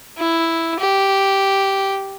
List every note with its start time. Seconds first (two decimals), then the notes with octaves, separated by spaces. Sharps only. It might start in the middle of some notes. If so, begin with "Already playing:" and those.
0.17 E4
0.79 G4